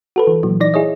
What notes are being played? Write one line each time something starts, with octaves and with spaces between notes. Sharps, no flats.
F#4 A4 B4
E3
A#2 E3 F#3
E3 D#4 D5 A#6
E4 G#4 C#5 D#5